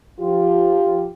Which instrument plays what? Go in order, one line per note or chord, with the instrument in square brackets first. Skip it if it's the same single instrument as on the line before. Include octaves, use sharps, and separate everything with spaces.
[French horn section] F3 F4 G4